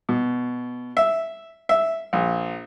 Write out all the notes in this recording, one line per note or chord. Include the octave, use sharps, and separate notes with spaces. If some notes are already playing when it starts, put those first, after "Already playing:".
B2
E5
E5
A#1